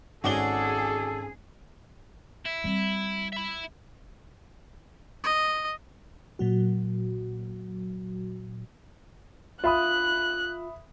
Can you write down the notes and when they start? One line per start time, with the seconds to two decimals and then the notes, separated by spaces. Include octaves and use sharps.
0.24 G#1 C#4 F#4 G#4 A4 D5 G7
2.46 E4
2.64 G3 C4
3.33 E5 B5
5.24 D#5
6.39 A#2 F#3 F#4
9.64 F4 E5 B5 D#6 F#6